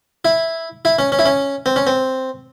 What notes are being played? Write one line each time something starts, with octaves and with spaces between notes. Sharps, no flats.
E4
E4
C#4
C#4
E4
C#4
C4
C#4
C4